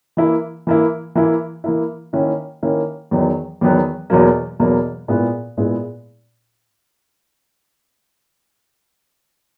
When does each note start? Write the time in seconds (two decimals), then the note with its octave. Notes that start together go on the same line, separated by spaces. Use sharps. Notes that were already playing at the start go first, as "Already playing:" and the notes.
0.17 E3 A#3 E4
0.67 E3 A#3 E4
1.15 E3 A#3 E4
1.64 E3 A#3 E4
2.13 D#3 A#3 C#4 E4
2.63 D#3 A#3 C#4 E4
3.11 E2 D#3 F#3 B3
3.61 E2 D#3 F#3 B3
4.10 E2 B2 F#3 A#3
4.60 E2 B2 F#3 A#3
5.08 A#2 G#3 B3 E4
5.57 A#2 G#3 B3 E4